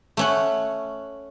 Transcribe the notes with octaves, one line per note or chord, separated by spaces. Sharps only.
A3 C#4 F#5